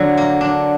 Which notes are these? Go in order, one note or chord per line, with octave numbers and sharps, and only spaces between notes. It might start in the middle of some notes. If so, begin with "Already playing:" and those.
Already playing: D3 F#3
A#3
D4